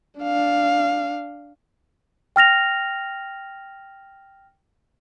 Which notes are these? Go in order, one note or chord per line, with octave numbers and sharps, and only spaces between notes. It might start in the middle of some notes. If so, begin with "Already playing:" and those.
D4 F5
G5 F6 A#6 F7